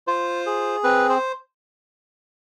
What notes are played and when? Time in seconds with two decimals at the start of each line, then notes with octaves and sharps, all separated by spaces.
0.07 F4 C5
0.46 G#4
0.84 C4 B4
1.09 C5